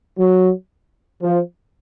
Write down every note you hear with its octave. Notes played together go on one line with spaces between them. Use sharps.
F#3
F3